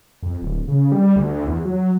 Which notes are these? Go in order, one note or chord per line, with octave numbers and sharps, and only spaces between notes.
F2
D1
C#3
G3
D2
E2
F#3